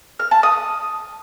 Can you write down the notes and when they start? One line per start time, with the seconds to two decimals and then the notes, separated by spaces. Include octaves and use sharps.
0.19 F6
0.31 A5
0.43 D#6